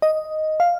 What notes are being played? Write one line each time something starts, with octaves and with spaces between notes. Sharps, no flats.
D#5
F5